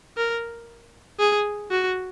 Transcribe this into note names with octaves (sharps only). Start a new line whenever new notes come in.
A#4
G#4
F#4